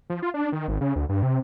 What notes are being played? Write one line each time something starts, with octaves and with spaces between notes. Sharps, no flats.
F3
F4
D4
D#3
G#1
C#3
D2
G2
C3